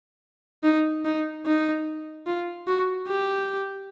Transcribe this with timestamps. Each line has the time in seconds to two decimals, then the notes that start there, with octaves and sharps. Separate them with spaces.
0.63 D#4
1.05 D#4
1.46 D#4
2.27 F4
2.67 F#4
3.08 G4